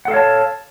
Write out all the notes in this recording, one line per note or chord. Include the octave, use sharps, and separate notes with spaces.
A4 C#5 F5 F#5 A5